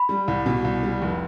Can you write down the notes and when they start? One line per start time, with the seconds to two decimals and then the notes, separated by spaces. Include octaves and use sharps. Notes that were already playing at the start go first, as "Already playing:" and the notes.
Already playing: B5
0.09 G3
0.28 C2
0.46 B2
0.64 C2
0.83 G3
1.02 F1